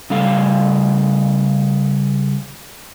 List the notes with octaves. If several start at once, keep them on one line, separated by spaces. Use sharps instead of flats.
C#3 G3 A4 F5